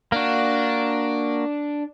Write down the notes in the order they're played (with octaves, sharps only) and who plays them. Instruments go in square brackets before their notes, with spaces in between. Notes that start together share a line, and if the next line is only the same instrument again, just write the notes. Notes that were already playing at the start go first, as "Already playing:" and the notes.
[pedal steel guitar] A#3 F#4 [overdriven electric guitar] D4